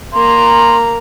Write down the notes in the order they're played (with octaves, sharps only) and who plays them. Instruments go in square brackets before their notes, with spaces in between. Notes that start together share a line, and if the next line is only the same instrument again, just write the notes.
[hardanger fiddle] A#3 A#5 [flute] C6